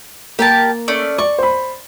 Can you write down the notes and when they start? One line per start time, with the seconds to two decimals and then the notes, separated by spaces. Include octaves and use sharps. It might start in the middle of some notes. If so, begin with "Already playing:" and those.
0.39 A#3 G4 A#4 A5
0.88 A3 C#4 D5
1.18 D5 C#6
1.38 C5 B5